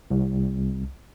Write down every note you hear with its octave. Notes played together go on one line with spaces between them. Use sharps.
C2